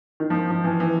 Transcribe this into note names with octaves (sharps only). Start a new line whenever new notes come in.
D#3
F3
F3
E3
E3